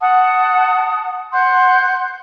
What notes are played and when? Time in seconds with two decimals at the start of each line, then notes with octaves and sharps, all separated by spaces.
0.01 F#5 A5 D#6
1.32 F#5 C6 F#6 G6